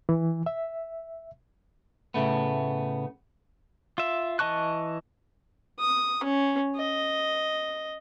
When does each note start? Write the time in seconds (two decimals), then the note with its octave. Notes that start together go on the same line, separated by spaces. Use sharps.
0.09 E3
0.46 E5
2.14 A2 C#3 A3 B3
3.98 F4 E5
4.39 E3 D#5 A5 C#6 F#6
5.79 D#6
6.24 C#4
6.76 D#5